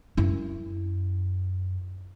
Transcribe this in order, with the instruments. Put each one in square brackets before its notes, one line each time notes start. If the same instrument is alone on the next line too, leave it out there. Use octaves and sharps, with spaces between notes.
[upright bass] F#2 E4